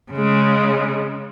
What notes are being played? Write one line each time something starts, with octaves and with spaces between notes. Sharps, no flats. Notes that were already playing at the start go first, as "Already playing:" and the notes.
C#3 G#3